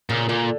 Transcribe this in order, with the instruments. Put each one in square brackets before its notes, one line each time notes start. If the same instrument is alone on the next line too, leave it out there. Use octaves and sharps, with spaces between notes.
[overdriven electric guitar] A#2 [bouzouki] C#3
[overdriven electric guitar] A#2 [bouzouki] D3